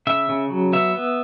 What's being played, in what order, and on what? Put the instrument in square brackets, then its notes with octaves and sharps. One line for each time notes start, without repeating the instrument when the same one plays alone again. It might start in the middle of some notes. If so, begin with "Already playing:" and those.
[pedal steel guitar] C#3 E5
C#3
F#3
B3 E5
B3